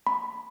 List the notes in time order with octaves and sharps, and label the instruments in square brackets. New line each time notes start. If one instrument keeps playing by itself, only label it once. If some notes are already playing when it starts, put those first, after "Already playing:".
[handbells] B5